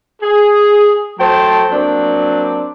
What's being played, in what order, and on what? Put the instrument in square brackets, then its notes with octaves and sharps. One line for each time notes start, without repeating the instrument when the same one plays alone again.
[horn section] G#4
F#3 A3 C5 G5 A5
F#3 A#3 C4 D4